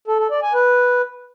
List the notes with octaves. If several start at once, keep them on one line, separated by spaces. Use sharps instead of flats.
A4
A4
D5
G#5
B4